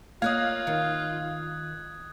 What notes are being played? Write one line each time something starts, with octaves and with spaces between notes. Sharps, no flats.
A#3 F4 C#5 D#5 F5 D#6 F#6 G#6
D#3